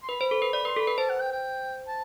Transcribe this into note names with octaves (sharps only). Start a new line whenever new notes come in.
C6
B4 B5
C5
A4
B4
D5 B5
B4 C6
A4
B5
B4
C5 A5
F#5
G5
G5
A5